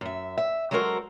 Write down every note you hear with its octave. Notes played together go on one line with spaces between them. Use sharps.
F#2 E5
E5
F#3 G#3 F#4 A4 A#4 C5